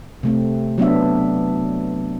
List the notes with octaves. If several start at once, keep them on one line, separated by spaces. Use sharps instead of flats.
C3 A3 C4
F#3 B3 D4 E5